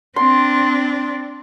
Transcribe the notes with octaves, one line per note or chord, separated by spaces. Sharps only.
C4 D4 C6